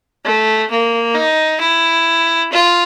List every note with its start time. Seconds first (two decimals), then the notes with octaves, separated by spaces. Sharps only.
0.25 A3
0.70 A#3
1.15 D#4
1.60 E4
2.52 F4